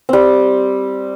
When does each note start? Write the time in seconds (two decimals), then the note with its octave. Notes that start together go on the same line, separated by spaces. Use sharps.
0.09 G3 C4